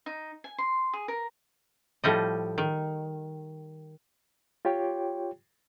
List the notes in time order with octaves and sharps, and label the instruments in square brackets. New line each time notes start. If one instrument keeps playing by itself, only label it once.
[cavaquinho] D#4
G#5
C6
G#4
A#4
[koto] A2 F3 G3 D#5
D#3
[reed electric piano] F4 G4 C#5 G5